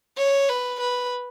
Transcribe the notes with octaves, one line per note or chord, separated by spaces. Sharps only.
C#5
B4
B4